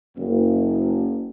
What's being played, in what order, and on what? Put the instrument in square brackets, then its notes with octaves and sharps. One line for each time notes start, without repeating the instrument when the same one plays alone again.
[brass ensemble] F#1